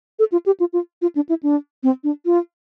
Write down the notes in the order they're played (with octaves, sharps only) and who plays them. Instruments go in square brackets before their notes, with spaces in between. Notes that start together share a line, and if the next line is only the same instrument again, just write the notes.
[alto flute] A4
F4
G4
F4
F4
F4
D4
E4
D4
C4
D4
F4